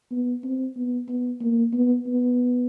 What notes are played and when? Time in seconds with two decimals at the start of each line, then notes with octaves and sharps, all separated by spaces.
0.11 B3
0.43 C4
0.76 B3
1.08 B3
1.41 A#3
1.73 B3
2.07 B3